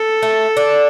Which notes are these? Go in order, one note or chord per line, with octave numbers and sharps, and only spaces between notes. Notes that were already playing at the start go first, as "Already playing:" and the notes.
Already playing: A4
A3
D4